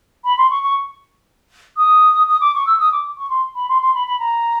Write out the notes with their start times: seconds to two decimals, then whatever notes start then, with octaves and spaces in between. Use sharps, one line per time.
0.24 B5
0.38 C6
0.50 C#6
0.63 C#6
1.77 D#6
2.28 D#6
2.41 D6
2.54 C#6
2.67 E6
2.80 D#6
2.92 D6
3.17 C#6
3.30 C6
3.55 B5
3.69 C6
3.82 C6
3.95 B5
4.07 B5
4.19 A#5